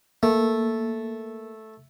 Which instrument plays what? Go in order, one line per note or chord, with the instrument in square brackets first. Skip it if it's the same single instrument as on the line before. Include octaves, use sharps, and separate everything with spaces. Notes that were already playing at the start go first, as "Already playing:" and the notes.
[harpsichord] A3 [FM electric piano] A#3